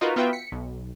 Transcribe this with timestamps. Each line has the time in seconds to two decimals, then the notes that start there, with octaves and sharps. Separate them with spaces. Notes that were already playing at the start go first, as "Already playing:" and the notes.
0.01 D#4 F4 F#4 A#4 B4
0.16 B3 F4 F#4 B4 E5 G5
0.33 B6 C#7
0.52 B1